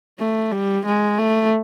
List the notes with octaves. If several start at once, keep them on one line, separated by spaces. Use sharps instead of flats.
A3
G3
G#3
A3